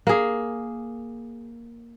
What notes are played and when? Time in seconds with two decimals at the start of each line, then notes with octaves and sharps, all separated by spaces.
0.07 A#3 G#4